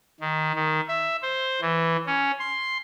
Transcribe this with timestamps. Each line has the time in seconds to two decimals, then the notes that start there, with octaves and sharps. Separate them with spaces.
0.20 D#3
0.55 D#3
0.88 E5
1.22 C5
1.61 E3
2.06 C#4
2.39 C6